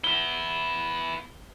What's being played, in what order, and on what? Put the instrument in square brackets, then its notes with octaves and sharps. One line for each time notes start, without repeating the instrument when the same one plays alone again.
[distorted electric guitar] B3 E4 [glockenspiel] G7